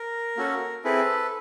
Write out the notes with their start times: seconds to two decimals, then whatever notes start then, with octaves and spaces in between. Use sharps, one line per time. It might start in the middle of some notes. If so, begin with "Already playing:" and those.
Already playing: A#4
0.37 A#3 C#4 F#4 A4
0.84 C4 E4 G#4 A4 B4